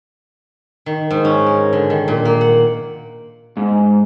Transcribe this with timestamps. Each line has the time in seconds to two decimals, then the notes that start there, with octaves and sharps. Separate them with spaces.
0.86 D#3
1.10 G#2
1.25 C#4
1.46 A#4
1.73 D3
1.90 D#3
2.08 A#2
2.25 A#3
2.41 F#5
3.57 G#2